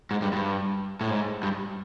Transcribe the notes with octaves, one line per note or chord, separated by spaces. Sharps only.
G#2
G2
G2
A2
G#2
G2